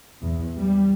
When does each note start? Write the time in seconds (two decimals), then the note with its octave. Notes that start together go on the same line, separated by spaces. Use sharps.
0.21 E2
0.58 G3